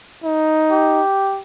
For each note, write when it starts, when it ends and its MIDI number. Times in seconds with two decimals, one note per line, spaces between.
0.24 1.02 63
0.71 1.40 67